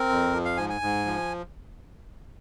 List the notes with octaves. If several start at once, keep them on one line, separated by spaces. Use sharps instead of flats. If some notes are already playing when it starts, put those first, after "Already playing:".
Already playing: C4 A#4
F2
F3
F5
G#2 G#5
G#5
G#2
F3